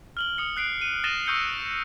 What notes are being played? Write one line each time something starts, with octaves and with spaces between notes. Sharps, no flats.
F6 F#7 G7
D#6 C#7
F#6 C7 D7
D#7
D#6 A6 A#6 D#7 E7 G7
C#6 D#6 E6 G6 C#7 G7